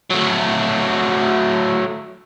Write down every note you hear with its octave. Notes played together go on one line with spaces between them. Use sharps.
F#3 A3